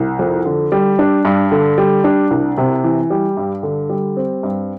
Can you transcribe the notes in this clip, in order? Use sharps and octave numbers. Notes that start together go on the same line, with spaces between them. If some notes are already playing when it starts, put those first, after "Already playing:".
Already playing: C2
F2
D3
G3
D4
G2
D3
G3
D4
C2
C3
E3
G3
G2
D3
G3
C4
G2